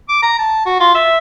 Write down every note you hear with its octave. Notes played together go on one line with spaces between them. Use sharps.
D6
A#5
A5
F#4
F4
E5